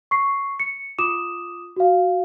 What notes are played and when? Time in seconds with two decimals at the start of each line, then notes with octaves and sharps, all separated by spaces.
0.11 C#6 C7
0.60 C#7
0.99 F4 D6 D#6 E7
1.76 F#4 F5